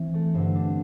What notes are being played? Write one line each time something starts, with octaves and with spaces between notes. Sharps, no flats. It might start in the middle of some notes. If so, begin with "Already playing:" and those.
Already playing: E3 C4
A3
G2 D3 C4
D4